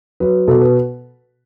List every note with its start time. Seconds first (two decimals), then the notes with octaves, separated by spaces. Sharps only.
0.20 F#3 B4
0.48 B2 A4
0.62 B4